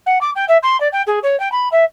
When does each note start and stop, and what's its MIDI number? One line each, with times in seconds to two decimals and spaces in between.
0.06 0.19 78
0.21 0.31 86
0.36 0.45 79
0.48 0.58 76
0.63 0.79 84
0.80 0.88 74
0.92 1.02 79
1.07 1.19 68
1.23 1.39 73
1.40 1.51 79
1.52 1.69 83
1.72 1.84 76